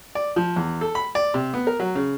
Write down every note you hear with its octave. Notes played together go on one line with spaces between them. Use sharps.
D5
F3
E2
A4
B5
D5
C3
B3
A#4
F#3
C#3